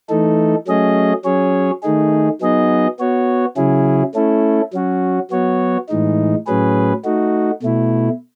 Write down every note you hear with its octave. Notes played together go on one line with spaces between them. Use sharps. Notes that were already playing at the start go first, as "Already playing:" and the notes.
E3 A3 D#4 A4
F#3 A3 C#4 G#4 D#5
F#3 C#4 G#4 C#5
D#3 A3 D#4 G#4
F#3 B3 D#4 G#4 D#5
B3 F#4 C#5
C#3 F#3 C#4 E4 G#4
A3 C#4 E4 A4
F#3 C#4 F#4
F#3 B3 F#4 C#5
A2 E3 G#3 D#4
A2 F#3 C#4 G#4 B4
A3 D#4 F#4
B2 A3 E4